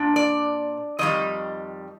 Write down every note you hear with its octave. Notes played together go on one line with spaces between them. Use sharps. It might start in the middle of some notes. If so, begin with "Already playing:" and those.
Already playing: A#2 D4
D5
F2 D#3 G3 D#5